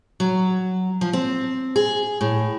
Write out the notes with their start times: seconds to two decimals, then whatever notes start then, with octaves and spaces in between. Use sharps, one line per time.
0.20 F#3
1.01 F3
1.13 C4
1.76 G#4
2.21 A2